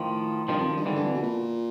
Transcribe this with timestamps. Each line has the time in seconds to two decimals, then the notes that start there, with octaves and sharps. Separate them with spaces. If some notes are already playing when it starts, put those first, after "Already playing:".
Already playing: A2 D#3 F3
0.48 G2 D#3 F3
0.58 F2
0.67 F#2
0.77 G2
0.86 G#2 D3 E3
0.95 G2
1.05 F2
1.14 B2
1.23 A#2